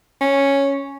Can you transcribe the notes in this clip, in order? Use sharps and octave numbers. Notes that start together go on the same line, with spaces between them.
C#4